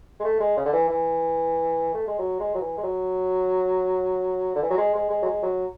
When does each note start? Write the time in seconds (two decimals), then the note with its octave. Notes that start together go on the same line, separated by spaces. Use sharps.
0.20 G#3
0.25 A3
0.40 G#3
0.57 C#3
0.66 D3
0.73 E3
0.89 E3
1.94 A3
2.07 G#3
2.19 F#3
2.40 G#3
2.55 F#3
2.61 E3
2.78 G#3
2.84 F#3
4.55 D3
4.63 E3
4.70 F#3
4.78 G#3
4.95 G#3
5.10 G#3
5.22 F#3
5.26 G#3
5.43 F#3